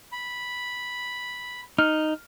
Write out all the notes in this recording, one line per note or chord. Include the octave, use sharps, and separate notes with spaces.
B5
D#4 F6